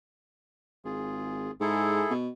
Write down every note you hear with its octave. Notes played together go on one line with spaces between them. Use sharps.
G#1 F4 G#4
G#2 E4 G#4 A4
B2